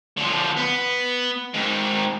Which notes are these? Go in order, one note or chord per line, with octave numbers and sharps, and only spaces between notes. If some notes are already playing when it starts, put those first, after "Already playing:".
D3 F3
B3
G#2 D#3